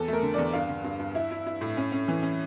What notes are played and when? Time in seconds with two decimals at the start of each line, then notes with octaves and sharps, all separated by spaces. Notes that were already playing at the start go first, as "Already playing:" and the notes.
Already playing: E2 A4
0.08 A3 A#4
0.23 D3
0.34 E2 D5
0.53 G2 F5
0.69 D3
0.84 G2
0.99 G2
1.15 E4 E5
1.31 E4
1.46 E4
1.61 A2
1.77 C#4
1.92 C#4
2.08 E3
2.22 C#4